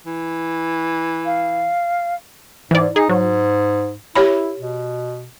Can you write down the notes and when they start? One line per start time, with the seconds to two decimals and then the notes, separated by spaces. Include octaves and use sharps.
0.06 E3
1.26 F5
2.71 G#2 E3 D5
2.96 D#4 G#4
3.09 G#2 F#3
4.15 E4 G4 C#5 B5
4.60 B2